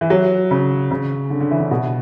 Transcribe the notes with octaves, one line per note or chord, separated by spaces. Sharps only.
E3
F#3
C#3
C#3
D3
D3
E3
D3
B2